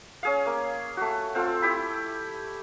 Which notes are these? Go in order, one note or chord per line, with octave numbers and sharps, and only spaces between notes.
C#4 G#4 F5
A#3
A3 F#4
C4 F4 A4
E4 G4 B5